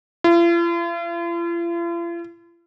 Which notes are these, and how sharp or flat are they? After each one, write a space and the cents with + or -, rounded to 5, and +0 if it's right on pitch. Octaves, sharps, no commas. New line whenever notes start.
F4 -45